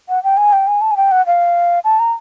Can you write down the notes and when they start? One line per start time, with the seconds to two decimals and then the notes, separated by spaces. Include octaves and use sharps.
0.09 F#5
0.24 G5
0.37 G#5
0.53 G5
0.67 G#5
0.81 A5
0.91 G#5
0.97 G5
1.11 F#5
1.26 F5
1.84 A5
1.99 A#5